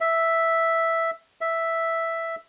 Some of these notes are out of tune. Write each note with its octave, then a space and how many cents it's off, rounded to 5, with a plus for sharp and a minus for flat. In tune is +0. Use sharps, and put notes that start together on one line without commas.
E5 +0
E5 +0